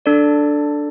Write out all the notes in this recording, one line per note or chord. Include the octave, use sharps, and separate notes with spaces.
D4 A4 D5